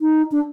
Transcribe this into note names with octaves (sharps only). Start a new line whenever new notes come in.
D#4
D4